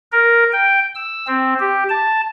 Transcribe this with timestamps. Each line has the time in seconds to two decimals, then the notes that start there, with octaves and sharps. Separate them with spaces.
0.12 A#4
0.52 G5
0.95 E6
1.27 C4
1.60 G4
1.89 A5